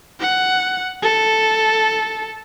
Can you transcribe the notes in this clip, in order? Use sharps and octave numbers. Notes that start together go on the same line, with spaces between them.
F#5
A4